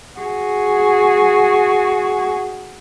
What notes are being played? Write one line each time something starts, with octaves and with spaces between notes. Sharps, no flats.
F#4 G#4